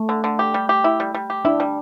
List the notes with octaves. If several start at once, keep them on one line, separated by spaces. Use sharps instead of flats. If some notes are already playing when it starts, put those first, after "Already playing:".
Already playing: A3
D3
D3
G4
G3
G4
E4
G3
G3
G4
D4 E4
G3